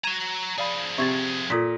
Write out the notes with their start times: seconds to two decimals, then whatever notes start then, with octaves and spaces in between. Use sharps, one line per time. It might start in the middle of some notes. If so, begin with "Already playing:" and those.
0.04 F#4 A#5 G#6 D#7 E7
0.58 F3 G#4 D5 F5 B5
0.98 C3 C#6 G#6 A6
1.50 A#2 A4 D#6 B6